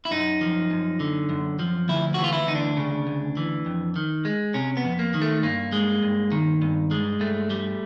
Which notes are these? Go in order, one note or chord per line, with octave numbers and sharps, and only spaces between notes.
E4
F#2 D#4
F3
F#2
D3
F#2
F3
D2 E4
E3 F#4
F4
E4
D2 D#4
D4
C#3
D2
E3
F2
D#3
G#3
C3 C#4
B3
F2
A#3
D#3
A3
G2 A#3
G#3
G2
D#3
G2
G#3
G2 A3
G3